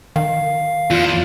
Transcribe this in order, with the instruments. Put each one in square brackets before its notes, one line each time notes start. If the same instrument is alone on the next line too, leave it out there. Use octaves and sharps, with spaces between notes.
[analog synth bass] D#3 [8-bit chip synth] F5
[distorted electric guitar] E2 [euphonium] F4